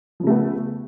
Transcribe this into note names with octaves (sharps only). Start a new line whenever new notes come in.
C#3 F3 A3 B3